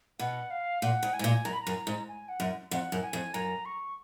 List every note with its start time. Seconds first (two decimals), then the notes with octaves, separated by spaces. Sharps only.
0.19 B2 F#5
0.51 F5
0.82 A#2 F#5
1.03 G#2
1.14 G#5
1.19 G#2
1.24 A#2
1.45 F#2 A#5
1.53 B5
1.62 A#5
1.67 F#2
1.87 G#2
2.08 G#5
2.29 F#5
2.40 F#2
2.71 F2 F#5
2.92 F#2
3.03 G#5
3.13 F2
3.34 F#2 A#5
3.66 C#6